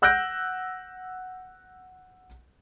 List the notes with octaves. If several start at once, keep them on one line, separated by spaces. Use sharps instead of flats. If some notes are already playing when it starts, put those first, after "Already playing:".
F#5 E6 F#6 G6 A#6 D7